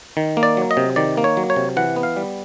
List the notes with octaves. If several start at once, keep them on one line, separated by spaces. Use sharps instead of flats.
D#3
A#3
D5
F#3
D#5
C3
D#3 D5
A#3
C#5
F#3
C#5
C3
E3 F#5
B3
F5
G3